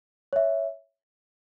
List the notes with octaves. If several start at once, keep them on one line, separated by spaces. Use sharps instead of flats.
C#5 E5